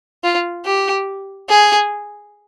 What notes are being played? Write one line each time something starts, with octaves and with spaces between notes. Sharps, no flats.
F4
G4
G#4